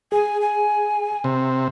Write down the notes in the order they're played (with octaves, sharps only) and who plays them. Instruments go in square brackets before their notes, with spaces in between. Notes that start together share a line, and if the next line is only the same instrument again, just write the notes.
[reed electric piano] G#4 [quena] G#5
[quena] G#5
[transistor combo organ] C3